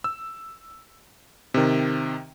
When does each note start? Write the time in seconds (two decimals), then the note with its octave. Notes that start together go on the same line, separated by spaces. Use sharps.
0.04 E6
1.54 C3 D#3